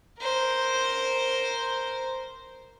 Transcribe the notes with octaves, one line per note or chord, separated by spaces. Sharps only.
A#4 C5